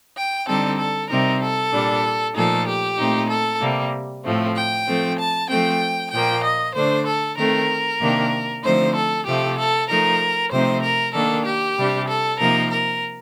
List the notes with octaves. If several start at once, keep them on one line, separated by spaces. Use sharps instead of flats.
G5
D3 G3 C4 D#4 A4
A4
C3 G3 C4 D#4 A#4
A4
A#2 G3 D4
A#2 F3 A3 D#4 A4
G4
A#2 A3 C4 D#4
A4
C3 G3 A#3
A2 F3 A3 C4
G5
F3 A3 C4
A5
F3 A3 C4 G5
A#2 F3 A#3 G5
D#5
D3 A3 D4 C5
A4
D#3 A3 C4 A#4
C3 D#3 A#3 D4
D3 F3 A3 C4 D#4 C5
A4
C3 F3 A3 G4
A4
F3 A3 D#4 A#4
C3 F3 A3 C4 D#4 C5
A#4
D#3 A#3 D4 A4
G4
C3 G3 D4
A4
C3 F3 A#3 D#4 A#4
A#4